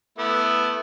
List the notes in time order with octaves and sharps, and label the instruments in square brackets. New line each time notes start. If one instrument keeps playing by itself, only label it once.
[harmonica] A3 B3 E4